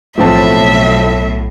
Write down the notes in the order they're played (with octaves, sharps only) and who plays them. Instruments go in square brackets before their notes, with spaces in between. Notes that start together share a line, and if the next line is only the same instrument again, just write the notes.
[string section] B1 A2 [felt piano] F3 C4 A5 [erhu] E5